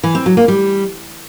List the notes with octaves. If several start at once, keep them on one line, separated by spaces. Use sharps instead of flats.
E3
C4
F#3
A#3
G3